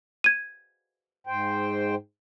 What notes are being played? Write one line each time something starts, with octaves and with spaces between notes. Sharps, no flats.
G#6 D#7
G#2 C5 G5